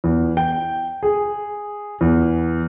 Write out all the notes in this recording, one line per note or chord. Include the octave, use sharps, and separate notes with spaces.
E2
G5
G#4
E2